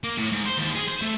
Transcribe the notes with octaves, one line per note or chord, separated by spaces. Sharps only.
A#3
A2
G#2
C5
D#2
G#4
C5
A3